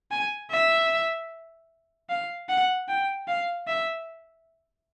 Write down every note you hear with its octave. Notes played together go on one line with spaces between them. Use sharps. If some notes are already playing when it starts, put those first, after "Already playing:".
G#5
E5
F5
F#5
G5
F5
E5